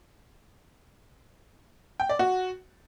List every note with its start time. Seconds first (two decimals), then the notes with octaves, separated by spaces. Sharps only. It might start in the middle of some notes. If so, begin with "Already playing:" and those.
2.00 G5
2.09 D5
2.19 F#4